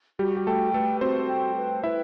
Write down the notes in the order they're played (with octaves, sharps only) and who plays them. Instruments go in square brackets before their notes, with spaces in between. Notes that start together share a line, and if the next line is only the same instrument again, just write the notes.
[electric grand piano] G3 G4 [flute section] F#4
[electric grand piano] G4
[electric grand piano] A3 A4 [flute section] G5
[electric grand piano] A3 A4 [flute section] B4
[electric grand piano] C4 C5 [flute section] F#4
[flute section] G5
B4
[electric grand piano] E4 E5 [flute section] B4